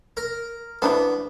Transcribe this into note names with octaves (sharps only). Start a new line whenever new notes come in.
A#4
E3 B3 D4 C5